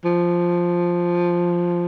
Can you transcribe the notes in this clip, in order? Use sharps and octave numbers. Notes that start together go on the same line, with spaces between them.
F3